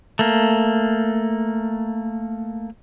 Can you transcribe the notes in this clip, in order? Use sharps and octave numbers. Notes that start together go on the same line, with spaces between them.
A3 A#3